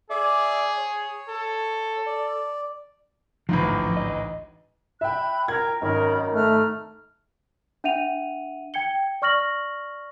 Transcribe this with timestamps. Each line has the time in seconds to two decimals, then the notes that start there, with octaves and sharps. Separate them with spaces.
0.10 G#4 D5 E5 D6
0.78 C#5
1.29 A4
2.06 D5
3.49 A1 D2 G#2 F3
3.97 D#5
5.01 E5 G5 B5 F#6
5.48 A#4 G5 A#5 G#6
5.82 G#1 F#2 D#3 A#4 D#5 B5
6.35 A3 A#5 F6 F#6
7.84 D4 E5 F#5 D#7 F7
8.74 G5 G#6 C#7 G7
9.22 D5 C#6 F6 A#6 F#7